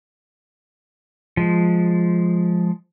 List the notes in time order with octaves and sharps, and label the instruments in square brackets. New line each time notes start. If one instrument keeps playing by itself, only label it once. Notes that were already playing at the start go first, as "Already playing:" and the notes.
[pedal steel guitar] F3 G#3